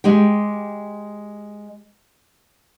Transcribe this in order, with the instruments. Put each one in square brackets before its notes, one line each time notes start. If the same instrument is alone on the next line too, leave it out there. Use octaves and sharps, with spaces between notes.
[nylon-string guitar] G#3 G4 G5